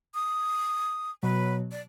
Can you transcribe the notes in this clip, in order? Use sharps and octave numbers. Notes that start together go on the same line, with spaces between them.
D#6
B2 F#3 B4
D5